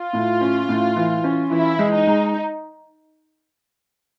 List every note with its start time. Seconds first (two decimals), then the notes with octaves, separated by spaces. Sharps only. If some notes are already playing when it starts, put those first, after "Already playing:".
Already playing: F4
0.13 A2
0.41 C#4
0.69 A2
0.96 E3
1.24 C#4
1.51 E3 E4
1.79 G#3
1.93 D#4
2.07 G#3